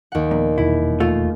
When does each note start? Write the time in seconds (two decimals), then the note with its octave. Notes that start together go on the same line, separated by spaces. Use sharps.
0.12 D#2 F#5
0.31 A#2 F3 A#3 B3
0.58 D#1 E2 B2 E4
1.00 A3 F4